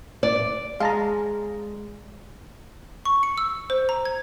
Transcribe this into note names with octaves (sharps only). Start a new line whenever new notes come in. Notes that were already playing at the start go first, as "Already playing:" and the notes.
D5
G#3 F5 A5 A#5
C#6
C#7
E6
C5
A#5
G#6